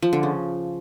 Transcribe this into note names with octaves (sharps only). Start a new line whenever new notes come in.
F3
D3
C#3